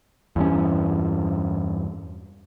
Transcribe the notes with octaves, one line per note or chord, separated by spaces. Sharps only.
E2 G2 C#4